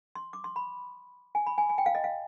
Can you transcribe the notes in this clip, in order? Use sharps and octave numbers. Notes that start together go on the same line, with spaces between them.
C6
D6
C6
B5
G#5
B5
G#5
G#5
G5
F5
D#5
F5